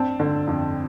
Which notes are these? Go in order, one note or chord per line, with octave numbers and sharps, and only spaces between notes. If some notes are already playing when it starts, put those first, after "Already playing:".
Already playing: C4 D4 A5
D3
F2